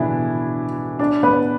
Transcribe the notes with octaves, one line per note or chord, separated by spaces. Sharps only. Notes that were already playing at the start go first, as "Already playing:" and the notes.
Already playing: B2 D3 E3 B3 D4 E4
D4 D5
B3 B4